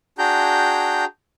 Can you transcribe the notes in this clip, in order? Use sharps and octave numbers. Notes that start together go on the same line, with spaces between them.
D4 F#4 G#4 G5 A#5 G6